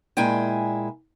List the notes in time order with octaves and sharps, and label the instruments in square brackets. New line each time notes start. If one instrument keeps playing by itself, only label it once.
[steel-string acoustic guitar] A#2 G#3 E4 G5 G#5